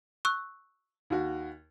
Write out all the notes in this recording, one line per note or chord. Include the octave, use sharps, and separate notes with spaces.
C#6 E6 F#6
D#2 F#4